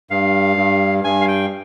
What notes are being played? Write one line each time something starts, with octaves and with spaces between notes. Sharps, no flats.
G2 F5
G2
G2 G#5
F5
G5